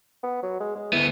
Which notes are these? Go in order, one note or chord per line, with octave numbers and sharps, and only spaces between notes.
B3
F#3
G#3
G#3
D2 B3 E4